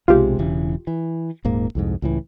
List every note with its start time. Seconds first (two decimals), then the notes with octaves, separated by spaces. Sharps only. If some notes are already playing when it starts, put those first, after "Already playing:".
0.08 B1 C3 G#3 F4 G4
0.39 E1 C#3 E3
0.87 E3
1.45 D#1 G#2 A#3
1.75 C2 F2 G#2
2.02 C#2 A2 E3